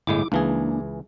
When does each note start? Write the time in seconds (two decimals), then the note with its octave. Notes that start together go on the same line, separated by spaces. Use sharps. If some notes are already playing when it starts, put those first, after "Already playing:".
0.07 G1 A2 G#3 E4 D6
0.32 C#2 E3 A#3 D4 G#4